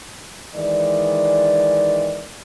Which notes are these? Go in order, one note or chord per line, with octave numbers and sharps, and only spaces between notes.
D#3 E3 G#3 D5